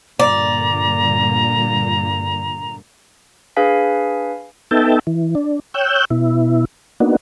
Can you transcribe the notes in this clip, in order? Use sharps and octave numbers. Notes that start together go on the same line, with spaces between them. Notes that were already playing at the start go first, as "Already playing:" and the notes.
G2 A#2 D3 D5 A#5
D4 G#4 B4 F5 G#5 B6
B3 D#4 A4 E5 G5 A5
E3
D4
C#5 G5 E6 F#6 G6
B2 E4
A#3 B3 D4 D#4 F#4